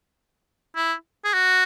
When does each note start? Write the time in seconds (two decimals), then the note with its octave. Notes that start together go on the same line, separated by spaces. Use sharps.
0.76 E4
1.25 G#4
1.34 F#4